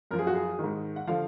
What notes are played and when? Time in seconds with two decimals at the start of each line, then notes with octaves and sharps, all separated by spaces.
0.11 F#2 F3 A#4
0.19 G#4
0.27 F#4
0.35 G#4
0.59 G#2 D#3
0.96 F#5
1.07 D3 F3 F5